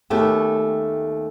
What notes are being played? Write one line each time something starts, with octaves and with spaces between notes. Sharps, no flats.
D#2 A3 B3 C#4 G4 A4